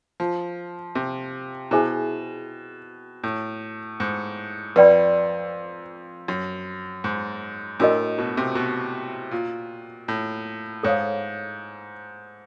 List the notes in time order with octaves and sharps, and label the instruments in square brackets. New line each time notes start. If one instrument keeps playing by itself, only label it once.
[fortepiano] F3
C3
[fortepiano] B2 [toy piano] E4 G#4 C5 E5 G#5
[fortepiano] A2
G#2
[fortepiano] F2 [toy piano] B4 D5 G5 B5
[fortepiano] F#2
G#2
[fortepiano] A2 [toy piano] D4 F#4 A#4 D#5
[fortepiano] B2
C3
B2
A#2
A2
[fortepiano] G#2 [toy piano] A4 C#5 F5